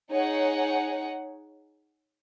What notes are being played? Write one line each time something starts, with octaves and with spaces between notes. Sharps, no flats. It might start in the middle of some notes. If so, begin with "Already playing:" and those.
D#4 G#4 C#5 F#5